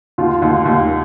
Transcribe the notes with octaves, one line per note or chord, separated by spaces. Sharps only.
D#2 F4
D#2
D#2